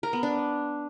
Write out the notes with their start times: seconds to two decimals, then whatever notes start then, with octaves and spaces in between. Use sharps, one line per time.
0.03 A#4
0.13 B3
0.23 D4